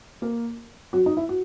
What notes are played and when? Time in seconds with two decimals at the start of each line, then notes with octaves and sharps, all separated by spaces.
0.22 A#3 A#4
0.93 F#3 F#4
1.06 D#4
1.17 E4
1.29 F#4